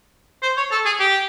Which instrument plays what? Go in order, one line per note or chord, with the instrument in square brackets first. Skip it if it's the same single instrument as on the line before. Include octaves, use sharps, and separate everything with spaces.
[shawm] C5
C#5
A4
G#4
G4